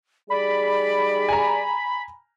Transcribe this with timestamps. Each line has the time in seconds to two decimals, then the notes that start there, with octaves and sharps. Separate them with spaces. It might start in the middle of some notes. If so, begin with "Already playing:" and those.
0.30 G3 D#4 G#4 D5 B5
1.29 G#5 A#5